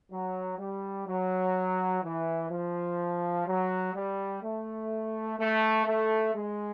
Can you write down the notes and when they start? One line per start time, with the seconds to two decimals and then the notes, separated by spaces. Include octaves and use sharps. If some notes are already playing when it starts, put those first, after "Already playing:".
0.11 F#3
0.58 G3
1.06 F#3
2.02 E3
2.50 F3
3.47 F#3
3.94 G3
4.42 A3
5.38 A3
5.86 A3
6.34 G#3